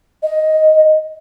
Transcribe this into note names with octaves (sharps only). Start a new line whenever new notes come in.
D#5